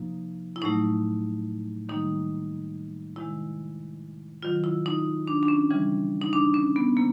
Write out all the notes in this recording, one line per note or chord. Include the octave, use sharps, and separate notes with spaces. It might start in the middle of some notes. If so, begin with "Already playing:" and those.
Already playing: C3 F3 A#3 D#4
E4
A2 F#3 A3 D#4
D#3 G3 A#3 D#4
C3 D#3 G#3 E4
C3 D#3 F#3 F4
E4
D#4
D4
D4
C#4
C#3 E3 G3
D#4
D4
C#4
B3
C3 A#3